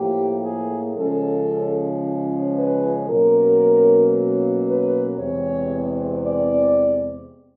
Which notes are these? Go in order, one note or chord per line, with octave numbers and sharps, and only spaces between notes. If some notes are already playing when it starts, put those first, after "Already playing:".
Already playing: A2 F3 A#3 G4
G#4
C#3 F3 G#3 C#4 A4
B4
B2 F#3 A#3 C#4 A#4
B4
E2 C3 E3 G#3 C4 C#5
D5